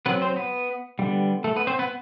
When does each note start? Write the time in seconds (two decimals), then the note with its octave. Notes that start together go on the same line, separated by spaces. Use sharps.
0.06 F#3 B3 C4 B4
0.22 C4 C5
0.36 B3 B4
0.99 D3 G3 B3
1.44 A3 A4
1.56 B3 B4
1.67 C4 C5
1.79 B3 B4